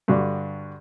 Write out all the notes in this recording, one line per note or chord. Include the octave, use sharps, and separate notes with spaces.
G2 D3 F#4 D5